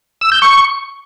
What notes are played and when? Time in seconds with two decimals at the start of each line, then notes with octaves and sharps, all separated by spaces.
0.21 E6
0.32 G6
0.42 C#6